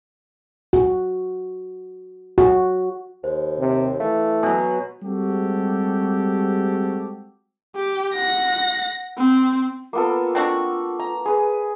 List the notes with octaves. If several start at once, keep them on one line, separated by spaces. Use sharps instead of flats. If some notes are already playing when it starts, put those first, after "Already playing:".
F#4
F#4
D#2 C5
C3
E3 A3 F5
B2 F#3 G#5
G3 G#3 C4 F#4 G4 A4
G4
F#5 A#6
C4
A#3 B3 F4 A4
C4 D4 F#4
A#5
G#4 B4